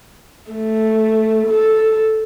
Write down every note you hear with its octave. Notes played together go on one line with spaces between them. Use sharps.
A3
A4